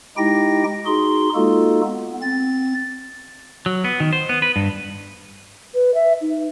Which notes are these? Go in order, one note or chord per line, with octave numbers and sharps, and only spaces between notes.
G#3 D#4 E4 G4 G5 A#6
D#4 F#4 G#4 C6
G#3 A#3 D#4 F4 F#4 A4
B3
C4 A6
F#3
B3
D#3
C5
B3
B4
G2
B4
E5
D#4